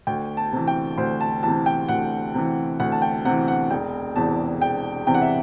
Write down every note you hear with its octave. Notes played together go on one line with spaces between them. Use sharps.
D2 G5
A5
C3 E3
G5
D2 C5
A5
C3 E3 A5
G5
D2 F#5
C3 E3
D2 F#5
A5
G5
C3 E3 F#5
F#5
E1 G5
E2 C3 E3 A5
E1 G5
E2 C3 E3 G5
F#5
E5